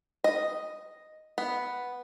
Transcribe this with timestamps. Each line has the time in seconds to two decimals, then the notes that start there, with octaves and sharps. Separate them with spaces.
0.24 D#5
1.38 B3